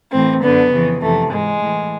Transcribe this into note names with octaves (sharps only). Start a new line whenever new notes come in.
A2 E3 C4
F#2 D3 B3
F2 C#3 E3
F2 C3 E3 A3
G#2 E3 G#3
A2 E3